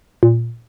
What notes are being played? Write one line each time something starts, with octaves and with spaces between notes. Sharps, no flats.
A#2